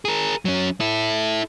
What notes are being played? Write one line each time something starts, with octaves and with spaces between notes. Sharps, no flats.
G#4 A#4
F#3 C#4
E4 A4